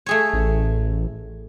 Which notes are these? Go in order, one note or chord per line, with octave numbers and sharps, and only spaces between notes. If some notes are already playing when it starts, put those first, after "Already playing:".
A3 G#4 C#5
A1